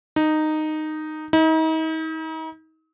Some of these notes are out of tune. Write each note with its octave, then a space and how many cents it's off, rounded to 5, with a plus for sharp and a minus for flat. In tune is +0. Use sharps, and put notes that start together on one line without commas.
D#4 -10
D#4 +40